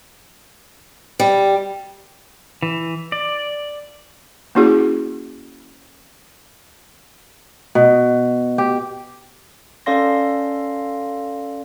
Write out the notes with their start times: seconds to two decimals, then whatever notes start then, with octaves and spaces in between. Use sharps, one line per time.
1.20 G3
2.62 E3
3.12 D5
4.55 A#3 C#4 E4 F#4 G#4
7.75 B2
8.58 G4
9.86 C#4 A4 D5 F5 C6 A#6